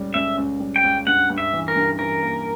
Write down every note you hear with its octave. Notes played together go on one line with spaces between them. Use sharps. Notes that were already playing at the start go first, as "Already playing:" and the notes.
Already playing: C#2 G3
C#2 E5
C#2
G3
G5
C#2
G2 F#5
G2
E5
E3
A#4
G2
E3 A#4
A#3